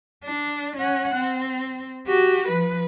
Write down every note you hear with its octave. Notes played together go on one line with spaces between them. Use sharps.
D4
C#4 F#5
C4
F#4 G4
F3 B4